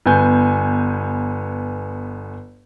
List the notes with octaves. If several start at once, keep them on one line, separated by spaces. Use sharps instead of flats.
G1 B3 G#5 G6